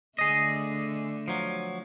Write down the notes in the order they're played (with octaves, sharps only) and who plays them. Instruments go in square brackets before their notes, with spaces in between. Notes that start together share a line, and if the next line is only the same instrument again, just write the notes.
[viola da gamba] D3 A3 [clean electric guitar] G#4 D#5
[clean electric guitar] F3 F#3